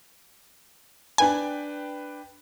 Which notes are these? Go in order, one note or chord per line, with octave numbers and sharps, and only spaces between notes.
D4 B4 G5 G#5